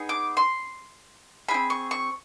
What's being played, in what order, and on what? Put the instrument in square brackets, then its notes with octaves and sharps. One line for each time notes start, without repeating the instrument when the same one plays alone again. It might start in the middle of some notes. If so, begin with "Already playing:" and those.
Already playing: [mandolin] B3 D#4 G#4
D6
C6
E4 G#4 B5
C4
C#6
C#6